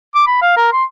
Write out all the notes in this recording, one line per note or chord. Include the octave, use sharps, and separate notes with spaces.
D6
B5
F5
A#4
C6